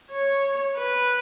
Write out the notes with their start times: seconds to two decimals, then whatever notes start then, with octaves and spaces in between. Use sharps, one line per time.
0.11 C#5
0.78 B4